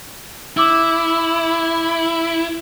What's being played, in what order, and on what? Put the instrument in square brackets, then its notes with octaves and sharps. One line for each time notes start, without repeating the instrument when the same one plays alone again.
[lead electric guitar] E4 [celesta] D6 E6